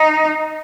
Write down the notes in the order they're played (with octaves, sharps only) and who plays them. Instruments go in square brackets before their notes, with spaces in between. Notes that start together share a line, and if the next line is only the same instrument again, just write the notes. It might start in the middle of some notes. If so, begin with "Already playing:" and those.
Already playing: [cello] D#4